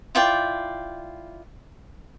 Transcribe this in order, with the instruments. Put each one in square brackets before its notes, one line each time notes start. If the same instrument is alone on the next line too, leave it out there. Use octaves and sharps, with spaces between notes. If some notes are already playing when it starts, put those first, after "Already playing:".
[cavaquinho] E4 F4 D5 G5